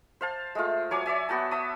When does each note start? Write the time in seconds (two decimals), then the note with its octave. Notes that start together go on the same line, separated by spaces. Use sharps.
0.21 C5 F5 A5
0.55 G#3 A3 F4
0.91 F#3 C#5 G#5 D6
1.06 C#5 D5 E5 G#5
1.29 B3 F#4 G5 A5
1.51 E5 A5 D#6